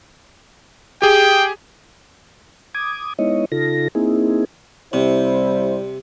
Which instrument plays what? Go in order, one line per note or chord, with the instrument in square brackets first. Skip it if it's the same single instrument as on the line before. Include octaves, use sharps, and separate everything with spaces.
[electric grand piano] G4 G#4 [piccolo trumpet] G5
[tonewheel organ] D6 D#6 G#6
G#3 B3 D#4 E4 C#5 D#5
C#3 D#4 F4 A4 A#6
A#3 C4 D#4 E4 G#4
[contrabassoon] C2 [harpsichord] C3 [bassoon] G3 [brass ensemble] E4 C5